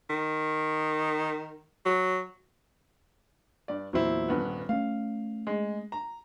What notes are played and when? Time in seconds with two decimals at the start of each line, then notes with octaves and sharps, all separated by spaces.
0.10 D#3
1.85 F#3
3.68 G2 D5
3.93 E2 A#2 F#3 C4 E4
4.29 D#1 G2 B3
4.69 A3 B3 C#4 F5
5.47 G#3
5.92 A#5